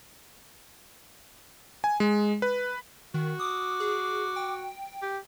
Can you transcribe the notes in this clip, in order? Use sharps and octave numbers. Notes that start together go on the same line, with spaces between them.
G#5
G#3
B4
D#3 F#4
D6 D#6
G#4
G5
G4